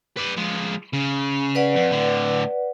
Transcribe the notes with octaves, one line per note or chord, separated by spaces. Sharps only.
B4 D5
F3 G#3
C#3
B4 D5 F#5
F2
A2 D3